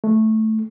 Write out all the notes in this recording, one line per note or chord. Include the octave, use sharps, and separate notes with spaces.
A3